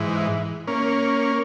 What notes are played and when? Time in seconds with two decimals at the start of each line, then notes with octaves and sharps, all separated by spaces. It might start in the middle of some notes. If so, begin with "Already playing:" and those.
Already playing: G#2 E3
0.67 A#3 C#4